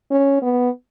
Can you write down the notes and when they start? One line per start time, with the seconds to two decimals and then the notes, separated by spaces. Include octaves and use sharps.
0.11 C#4
0.42 B3